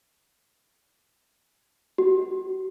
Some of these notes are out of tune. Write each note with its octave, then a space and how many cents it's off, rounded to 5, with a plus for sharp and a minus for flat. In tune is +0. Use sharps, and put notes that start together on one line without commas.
F#4 +35